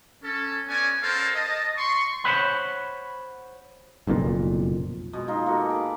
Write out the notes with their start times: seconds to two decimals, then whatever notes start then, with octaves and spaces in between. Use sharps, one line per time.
0.23 C#4 A4
0.69 B3 C#4 D5 G#5
1.03 C#4 A4 A#4 C5 D5 F5
1.35 D#5 A5
1.77 C6 C#6
2.24 C5 C#5 F#5 B5
4.07 F#1 B1 F2 A#2
5.13 B2 G#3
5.28 D#4 F4
5.46 A#3 F#4 G#4 A4
5.70 B5 D6